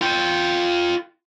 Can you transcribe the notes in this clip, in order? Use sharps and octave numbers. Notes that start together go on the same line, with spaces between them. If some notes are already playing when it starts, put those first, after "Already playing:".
F4 G5